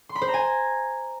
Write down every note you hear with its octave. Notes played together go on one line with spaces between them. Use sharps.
C6
B5
C5
A#5
G#5